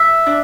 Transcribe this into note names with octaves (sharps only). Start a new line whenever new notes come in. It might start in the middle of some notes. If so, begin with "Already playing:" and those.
Already playing: E5
D4